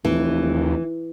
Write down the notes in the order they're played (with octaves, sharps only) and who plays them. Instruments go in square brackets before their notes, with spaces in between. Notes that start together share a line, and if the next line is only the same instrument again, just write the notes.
[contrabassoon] F1 [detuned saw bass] D#2 [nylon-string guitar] E3